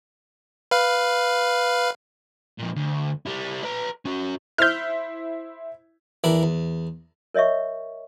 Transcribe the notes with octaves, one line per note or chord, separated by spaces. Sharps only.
B4 F5
F2 A#2
D2
G3 E4
B4 A#5
C#4 F#4
E4 C5 E5 F6 G6
E2 E3 D4 E4 A#4
E2
A#4 C#5 D#5 E5 C#6